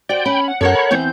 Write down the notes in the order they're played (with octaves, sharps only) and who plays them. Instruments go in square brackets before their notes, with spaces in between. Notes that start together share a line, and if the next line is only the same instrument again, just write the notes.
[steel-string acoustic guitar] F#4 C5 [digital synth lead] D5 [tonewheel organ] G5
[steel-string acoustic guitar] C#4 [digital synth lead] B5
[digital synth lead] F#5
[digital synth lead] F#2 [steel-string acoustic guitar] A4 A#4 F#5 [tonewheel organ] C#5
[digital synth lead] B5
[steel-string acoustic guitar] E2 E3 C4 [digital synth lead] G6